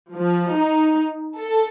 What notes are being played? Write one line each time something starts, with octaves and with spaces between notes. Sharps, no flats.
F3
D#4
A4